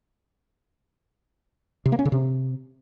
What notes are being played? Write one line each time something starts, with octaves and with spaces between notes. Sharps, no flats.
C3
A#3
C#4
C#3
C3